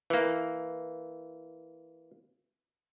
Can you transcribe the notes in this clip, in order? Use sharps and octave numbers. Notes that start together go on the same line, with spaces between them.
E3 A#3